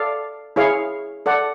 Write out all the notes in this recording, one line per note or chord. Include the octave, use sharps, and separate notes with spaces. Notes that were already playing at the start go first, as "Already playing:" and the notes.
Already playing: A4 D5 F5
E4 G#4 C#5 F5
A4 D5 F#5